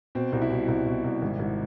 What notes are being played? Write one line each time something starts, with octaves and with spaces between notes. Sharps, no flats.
B2 C4
C2
E4
B2
C2 E4
B2
C2
G#1
G#1